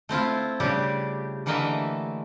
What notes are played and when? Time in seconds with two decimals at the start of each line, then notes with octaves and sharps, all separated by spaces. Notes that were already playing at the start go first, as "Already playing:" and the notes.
0.09 A3 C4 E4 F4
0.60 C#3 G3 D4 G4
1.46 D3 E3 A3 A#3 D#5 E5